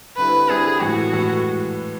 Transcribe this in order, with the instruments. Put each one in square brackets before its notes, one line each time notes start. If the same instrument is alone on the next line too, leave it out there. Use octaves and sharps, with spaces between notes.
[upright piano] D3 G3 C4 E4 [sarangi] B4
[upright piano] D3 G3 C4 E4 [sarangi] G#4
[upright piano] A2 E3 G#3 [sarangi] F#4
[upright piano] A2 E3 G#3